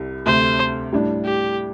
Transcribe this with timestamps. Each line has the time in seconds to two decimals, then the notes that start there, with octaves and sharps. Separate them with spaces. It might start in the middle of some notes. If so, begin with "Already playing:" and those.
Already playing: C2 C3 G3
0.26 D2 C3 A3 C5
0.93 A2 G3 D4
1.25 G4